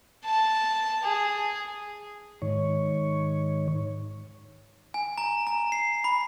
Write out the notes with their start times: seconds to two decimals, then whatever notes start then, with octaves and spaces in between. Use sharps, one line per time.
0.25 A5
1.03 G#4
2.42 G#2 D#3 C#5
4.94 G#5
5.18 A#5
5.47 A#5
5.72 C7
6.04 B5